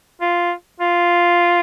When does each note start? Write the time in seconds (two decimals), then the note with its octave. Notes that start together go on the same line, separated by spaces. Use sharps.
0.22 F4
0.80 F4